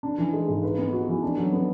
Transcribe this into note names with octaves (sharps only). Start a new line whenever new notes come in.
D4
E3
G#3
G#2
B4
B3
F#4
E3
D4
F#3
B3